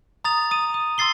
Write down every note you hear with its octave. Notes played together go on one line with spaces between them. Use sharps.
A#5 D#6 A6 F7
D#6 D#7
D#6
C6 E6 A6 C7 G7